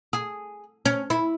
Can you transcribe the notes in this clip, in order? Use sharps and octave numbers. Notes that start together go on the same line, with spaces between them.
G#4
C#4
E4